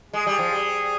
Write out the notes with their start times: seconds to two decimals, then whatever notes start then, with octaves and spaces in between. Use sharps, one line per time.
0.13 G#3 G#4
0.27 G3
0.39 F3
0.52 G3